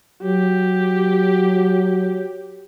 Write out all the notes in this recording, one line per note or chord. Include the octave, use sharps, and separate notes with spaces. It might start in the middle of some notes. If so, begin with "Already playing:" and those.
F#3 G4